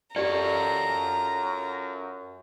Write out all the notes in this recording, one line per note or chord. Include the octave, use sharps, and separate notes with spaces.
F#2 F4 G4 A4 D5 A#5